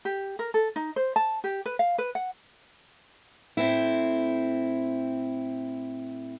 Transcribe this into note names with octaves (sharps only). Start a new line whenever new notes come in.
G4
A#4
A4
D#4
C5
A5
G4
B4
F5
B4
F#5
A2 C4 E4